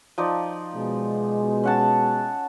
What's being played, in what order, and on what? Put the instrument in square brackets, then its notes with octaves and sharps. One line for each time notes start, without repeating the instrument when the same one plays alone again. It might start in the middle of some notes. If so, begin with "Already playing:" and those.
[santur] F3 D#4 D5
[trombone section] B2 G#3
[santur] C#4 F#5 A5